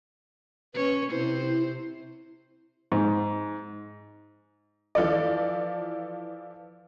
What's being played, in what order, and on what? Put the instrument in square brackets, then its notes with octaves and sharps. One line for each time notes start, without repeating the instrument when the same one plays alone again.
[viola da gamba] C#4 C#5 [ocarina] B4
[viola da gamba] C3 C5 [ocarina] E4
[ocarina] E4
[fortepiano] G#2
[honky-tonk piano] E3 F3 A4 D5